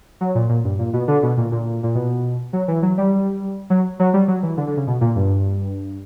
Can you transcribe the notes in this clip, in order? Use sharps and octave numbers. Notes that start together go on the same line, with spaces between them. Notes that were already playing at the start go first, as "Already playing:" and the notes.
F#3
A#2
A#2
G2
A#2
B2
D3
B2
A#2
A#2
A#2
B2
F#3
E3
F#3
G3
F#3
F#3
G3
F#3
E3
D3
D3
C#3
B2
A#2
G2